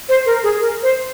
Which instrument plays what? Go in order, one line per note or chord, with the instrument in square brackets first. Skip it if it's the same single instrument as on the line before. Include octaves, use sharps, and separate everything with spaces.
[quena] C5
A#4
G#4
A#4
C5